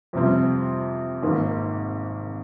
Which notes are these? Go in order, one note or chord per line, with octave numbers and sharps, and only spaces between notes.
F2 C3 G3 C4
G#1 G#2 D#3 A#3